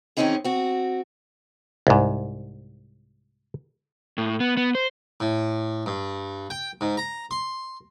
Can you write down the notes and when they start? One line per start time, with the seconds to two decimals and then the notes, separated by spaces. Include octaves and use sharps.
0.17 D#3 E3 C4 C#4 D#4 G#4
0.44 C4 F#4
1.87 C2 G#2
4.18 A2
4.40 B3
4.57 B3
4.75 C5
5.20 A2
5.86 G2
6.50 G5
6.81 G#2
6.97 A#5
7.31 C6